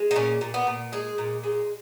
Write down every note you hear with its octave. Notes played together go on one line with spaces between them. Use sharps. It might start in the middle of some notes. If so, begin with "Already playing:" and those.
Already playing: G#3
D#4
A#2 C#4
A#2
B3
A#2
G#3 G#4
A#2
G#3